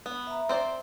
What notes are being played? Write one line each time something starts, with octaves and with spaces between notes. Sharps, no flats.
B3
E5 A#5
C4 C5 D5